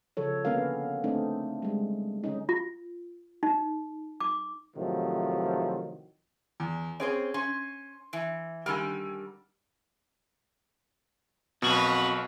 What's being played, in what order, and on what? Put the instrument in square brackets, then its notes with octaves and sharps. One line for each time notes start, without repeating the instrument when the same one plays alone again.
[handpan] C#3 F3 A4 C#5
D3 A#3 B3 C#4 A#4 F5
A3 C4 D4 D#4
G3 G#3
D3 C#4 D#4
[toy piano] F4
D#4
D6
[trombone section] A2 C3 D#3 F3 F#3
[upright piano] E2
[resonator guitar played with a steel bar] C4 G#4 C5 [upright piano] C#4
[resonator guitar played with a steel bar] C#4 [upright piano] C6
[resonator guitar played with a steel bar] E3
[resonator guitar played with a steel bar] D3 D#3 G3 [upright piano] G#5 E6 F6
[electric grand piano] B1 B2 [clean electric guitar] F2 F#4 [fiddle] A#4 B4